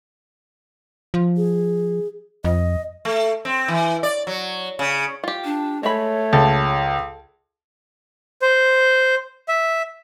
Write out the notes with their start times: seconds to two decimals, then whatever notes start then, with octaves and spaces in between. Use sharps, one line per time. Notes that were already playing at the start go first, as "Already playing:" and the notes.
1.14 F3
1.37 G#4
2.45 F2 D#5
3.05 A3
3.45 C4
3.68 E3
4.03 D5
4.27 F#3
4.79 C#3
5.24 F4 G4
5.45 D4
5.83 G#3 A3 C#5 B5
6.33 C#2 A4
8.42 C5
9.48 E5